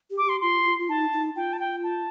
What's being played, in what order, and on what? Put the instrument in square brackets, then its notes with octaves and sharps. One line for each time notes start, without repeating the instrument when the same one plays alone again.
[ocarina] G4
[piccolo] D6
[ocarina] G4 [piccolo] C6
[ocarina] F4 [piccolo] C6
[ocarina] F4
F4
[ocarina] D#4 [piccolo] A5
[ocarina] D#4
[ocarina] F4 [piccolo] G5
[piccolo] A5
G5
A5